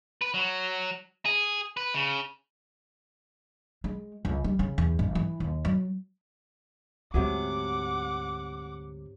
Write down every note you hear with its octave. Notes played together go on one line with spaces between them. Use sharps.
B4
F#3
G#4
B4
C#3
G#3
C#2
G3
C#3
E2
G#1
E3
D#2
F#3
D2 G#2 C3 F#3 G#4 F#5 D6